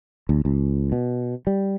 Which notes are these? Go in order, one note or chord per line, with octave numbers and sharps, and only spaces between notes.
D2
C#2
B2
G3